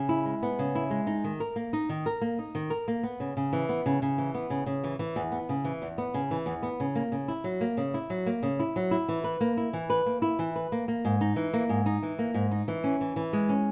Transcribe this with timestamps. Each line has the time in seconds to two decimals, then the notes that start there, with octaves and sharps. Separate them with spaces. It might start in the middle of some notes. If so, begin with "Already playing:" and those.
Already playing: C#3
0.09 E4
0.25 G#3
0.43 B3
0.59 C#3
0.75 E4
0.90 G#3
1.07 D#4
1.24 D#3
1.40 A#4
1.56 A#3
1.73 D#4
1.89 D#3
2.06 A#4
2.21 A#3
2.39 D#4
2.55 D#3
2.70 A#4
2.88 A#3
3.03 B3
3.20 C#3
3.37 C#3
3.53 E3
3.69 B3
3.86 C#3
4.02 C#3
4.18 E3
4.34 B3
4.50 C#3
4.66 C#3
4.84 E3
4.99 E3
5.16 E2
5.32 B3
5.49 C#3
5.65 E3
5.82 E2
5.98 B3
6.14 C#3
6.31 E3
6.46 E2
6.63 B3
6.80 C#3
6.95 A#3
7.12 C#3
7.28 E4
7.44 F#3
7.61 A#3
7.77 C#3
7.94 E4
8.10 F#3
8.26 A#3
8.43 C#3
8.59 E4
8.76 F#3
8.91 E4
9.09 E3
9.24 B4
9.41 A#3
9.57 E4
9.73 E3
9.90 B4
10.06 A#3
10.22 E4
10.39 E3
10.56 B4
10.72 A#3
10.88 A#3
11.05 G#2
11.21 D#4
11.36 E3
11.54 A#3
11.69 G#2
11.86 D#4
12.03 E3
12.19 A#3
12.34 G#2
12.51 D#4
12.68 E3
12.84 C#4
13.01 E3
13.16 E3
13.33 G#3
13.49 C#4